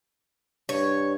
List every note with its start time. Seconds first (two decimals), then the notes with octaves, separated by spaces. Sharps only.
0.69 G2 C#5